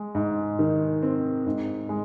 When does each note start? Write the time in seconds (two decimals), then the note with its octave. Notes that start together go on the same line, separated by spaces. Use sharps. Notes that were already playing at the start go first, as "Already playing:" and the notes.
Already playing: G#3
0.15 G#2
0.59 D#3
1.03 C4
1.46 G#2
1.89 G#3